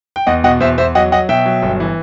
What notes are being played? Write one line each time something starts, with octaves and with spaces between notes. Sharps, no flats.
G5
E2 D#5 F#5
B2 D#5 F#5
E2 C5 E5
E2 C5 E5
F#3 D#5 F#5
F#3 D#5 F#5
B2 E5 G5
F#3
G1
E3